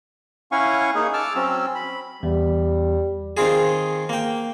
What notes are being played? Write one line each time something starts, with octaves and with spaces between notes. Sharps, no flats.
C#4 E4 F5 F#5 G#5 C#6
A#3 D#4 G#4
A5 D6 E6 F6
F#3 C4 C#4 E6
B5
E2 G3
D#3 C4 F4 G#4
A#3 G5